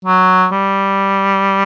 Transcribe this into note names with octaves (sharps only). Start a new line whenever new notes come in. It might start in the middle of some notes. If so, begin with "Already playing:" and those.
F#3
G3